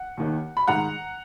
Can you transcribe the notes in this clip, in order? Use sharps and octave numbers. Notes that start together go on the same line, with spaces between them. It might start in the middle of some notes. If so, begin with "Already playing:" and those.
Already playing: F#5
D#2 D#3
B5
G#2 D#3 F#5 A#5